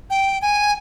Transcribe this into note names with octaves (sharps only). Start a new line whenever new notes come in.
G5
G#5